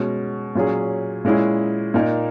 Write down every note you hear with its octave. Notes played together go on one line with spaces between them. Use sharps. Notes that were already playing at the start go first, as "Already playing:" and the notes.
Already playing: B2 G#3 C#4 G#4
A#2 F#3 C#4 G#4
A#2 G#3 C#4 E4 G#4
A#2 A#3 D#4 A#4